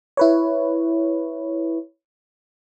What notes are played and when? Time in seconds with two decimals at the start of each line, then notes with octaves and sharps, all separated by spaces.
0.17 E4 B4 C#5